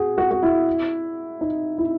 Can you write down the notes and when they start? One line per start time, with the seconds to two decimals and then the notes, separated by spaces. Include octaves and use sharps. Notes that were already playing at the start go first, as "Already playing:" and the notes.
Already playing: F#4 G#4
0.18 F#4
0.31 F#4
0.43 E4
1.41 D#4
1.78 E4